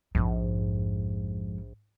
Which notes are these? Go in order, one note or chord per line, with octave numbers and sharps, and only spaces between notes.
A#1 F2 G#2